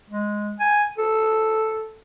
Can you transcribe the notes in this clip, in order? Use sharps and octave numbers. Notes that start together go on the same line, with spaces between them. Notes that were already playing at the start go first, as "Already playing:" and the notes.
G#3
G#5
A4